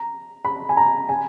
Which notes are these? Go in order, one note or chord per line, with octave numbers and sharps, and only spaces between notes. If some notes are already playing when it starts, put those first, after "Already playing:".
Already playing: A#5
B5
G#5
A#5
G#5